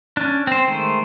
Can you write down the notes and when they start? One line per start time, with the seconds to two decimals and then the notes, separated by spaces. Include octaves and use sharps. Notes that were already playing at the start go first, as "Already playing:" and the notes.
0.17 C#4 D4
0.47 C4 C5
0.68 D#3 G#3 A3 C5